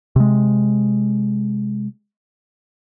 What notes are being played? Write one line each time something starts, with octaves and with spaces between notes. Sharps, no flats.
C3 G#3